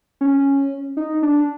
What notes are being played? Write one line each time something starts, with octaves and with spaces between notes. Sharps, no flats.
C#4
D#4
D4